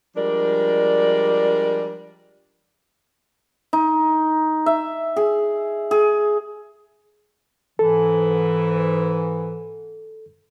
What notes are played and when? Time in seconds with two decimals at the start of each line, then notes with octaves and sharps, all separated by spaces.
0.17 F3 G3 G#3 D4 A#4 D5
3.73 D#4
4.66 E5
5.16 G#4
5.91 G#4
7.79 G#2 E3 A4